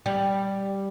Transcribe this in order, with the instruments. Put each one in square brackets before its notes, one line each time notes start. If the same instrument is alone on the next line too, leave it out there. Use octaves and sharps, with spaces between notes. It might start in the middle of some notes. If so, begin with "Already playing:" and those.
[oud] G3